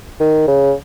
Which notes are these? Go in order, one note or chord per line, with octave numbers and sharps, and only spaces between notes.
D#3
C#3